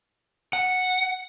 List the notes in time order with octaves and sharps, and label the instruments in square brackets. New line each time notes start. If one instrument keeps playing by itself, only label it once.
[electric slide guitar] F#5